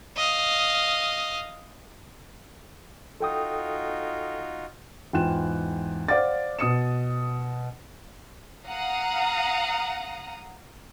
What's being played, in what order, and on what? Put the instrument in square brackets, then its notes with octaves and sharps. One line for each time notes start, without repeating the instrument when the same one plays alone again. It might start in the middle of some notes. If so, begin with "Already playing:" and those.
[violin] D#5 F5
[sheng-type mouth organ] D#4 F4 F#4 [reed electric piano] A4 G5 D#6
[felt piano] E2 G#2 F4 G5 F#6 E7
C5 D5 F5 F#5 D6 A6
B2 D#6 C#7 E7
[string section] F5 F#5 A#5 D#6